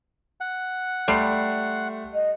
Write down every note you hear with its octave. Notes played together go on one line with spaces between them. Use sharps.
F#5
G3 A3 C6 C7
D#5